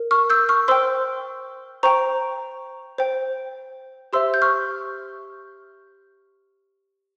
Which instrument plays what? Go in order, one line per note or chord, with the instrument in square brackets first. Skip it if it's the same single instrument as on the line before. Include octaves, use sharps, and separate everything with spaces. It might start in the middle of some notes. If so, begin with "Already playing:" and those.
Already playing: [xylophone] A#4
C#6 F6
E6 G6
C#6 F6
C5 G5 C6 E6
C5 G5 A#5 C#6
C5 G5
G4 C5 E5 C6 E6
G6
C#6 F6